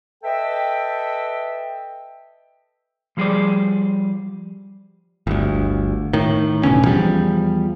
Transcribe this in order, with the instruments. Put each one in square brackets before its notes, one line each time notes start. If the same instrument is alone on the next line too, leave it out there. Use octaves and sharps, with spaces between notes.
[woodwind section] A4 B4 D#5 E5 G5
[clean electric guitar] F3 G3 G#4 B4 C5 D5
[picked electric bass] G1 D2
A2 D#3
F1 B2 D3 C#4
E2 F3 G3